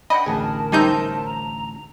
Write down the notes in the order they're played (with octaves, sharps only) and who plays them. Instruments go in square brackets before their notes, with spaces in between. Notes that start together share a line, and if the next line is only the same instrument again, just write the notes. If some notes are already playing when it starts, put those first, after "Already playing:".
[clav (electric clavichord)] D4 [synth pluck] D#5 [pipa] F#5 G5 B5
[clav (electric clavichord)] A1 D2 G#4 [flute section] A#4 A5
[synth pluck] G3 D#4 G6 [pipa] C#4 C5 E5
[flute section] A#5